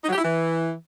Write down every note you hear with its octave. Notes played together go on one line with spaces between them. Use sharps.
D#4
F#3
G4
E4
E3